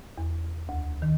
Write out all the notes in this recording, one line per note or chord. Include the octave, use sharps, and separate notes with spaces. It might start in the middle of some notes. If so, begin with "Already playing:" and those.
E2
D2
D#3